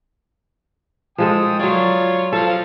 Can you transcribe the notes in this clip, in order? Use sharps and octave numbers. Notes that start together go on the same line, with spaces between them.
F3 G#3 A4 G5 D#6
F#3 F4 C#5 D5
F3 A4 F5